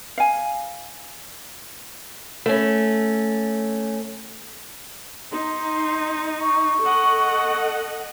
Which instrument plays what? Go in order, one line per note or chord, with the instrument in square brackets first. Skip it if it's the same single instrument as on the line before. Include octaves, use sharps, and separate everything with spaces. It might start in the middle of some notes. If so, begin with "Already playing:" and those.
[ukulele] F5 G#5
[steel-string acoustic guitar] A3 C#4
[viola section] D#4 [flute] C6
[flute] C#6
[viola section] A4 D#5 F#5